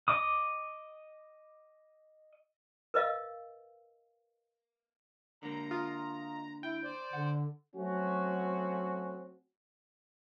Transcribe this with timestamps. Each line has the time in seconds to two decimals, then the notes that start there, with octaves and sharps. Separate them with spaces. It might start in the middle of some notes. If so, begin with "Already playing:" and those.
0.08 D#5 D6 D#6
2.94 A#4 B4 D#5 F5
5.43 D3 A#3 A#5
5.71 F4 D#5
6.63 E4 G5
6.84 C5 D5
7.13 D3 F#5
7.76 F#3 A3 C4 C#4 F#4